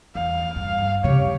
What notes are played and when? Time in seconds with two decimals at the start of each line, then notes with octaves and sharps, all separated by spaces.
0.15 E2 F5
0.56 G2
1.04 C#3 C4 G4 C#5